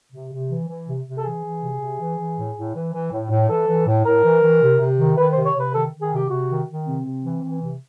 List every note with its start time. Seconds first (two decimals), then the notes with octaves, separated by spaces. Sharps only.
0.13 C3
0.31 C3
0.50 E3
0.69 E3
0.88 C3
1.06 C3
1.18 A4
1.25 E3 G#4
1.44 E3
1.63 C3
1.80 C3
2.00 E3
2.19 E3
2.37 A2
2.56 A2
2.75 E3
2.93 E3
3.12 A2
3.31 A2
3.49 E3 A4
3.68 E3
3.87 A2
4.06 A2 A#4
4.24 E3
4.43 E3
4.62 C3
4.81 C3
4.99 D#3
5.18 D#3 B4
5.33 C3 C5
5.46 C#5
5.55 C3
5.60 B4
5.74 D#3 A4
5.93 D#3
6.02 G#4
6.11 C3 G4
6.31 C3 F#4
6.49 D#3
6.68 D#3
6.87 C3 C4
7.05 C3
7.24 E3
7.42 E3
7.61 C3